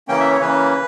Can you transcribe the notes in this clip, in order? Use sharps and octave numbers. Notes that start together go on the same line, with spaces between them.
C#3 E3 A#3 C#4 G5
E5
C#5
C#3 E3 A#3 C#4 B4